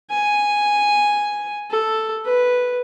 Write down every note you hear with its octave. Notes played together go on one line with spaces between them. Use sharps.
G#5
A4
B4